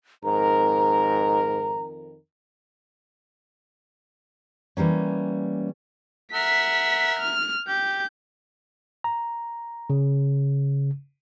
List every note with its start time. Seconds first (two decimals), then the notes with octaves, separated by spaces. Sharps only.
0.24 F2 G#2 D#3 A#4 A#5
4.77 E3 G3 A#3 C#4
6.34 A#4 E5 F#5 B6
7.19 F6
7.68 G4 G6
9.04 A#5
9.90 C#3